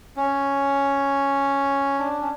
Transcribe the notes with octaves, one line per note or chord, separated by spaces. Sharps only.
C#4
D4
C#4